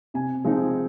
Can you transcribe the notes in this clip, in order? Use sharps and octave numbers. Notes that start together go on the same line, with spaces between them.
C3 G#5
F3 G#3 C4 D#4